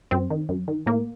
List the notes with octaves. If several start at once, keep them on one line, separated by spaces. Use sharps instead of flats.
F#2 C4
D#3
F#2
D#3
A2 A#3